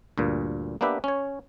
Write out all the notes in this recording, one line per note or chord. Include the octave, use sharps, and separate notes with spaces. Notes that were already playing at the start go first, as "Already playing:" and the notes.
D2 G2 A#2
A#3 B3 D4 G4 B4 E5
C#4 C#5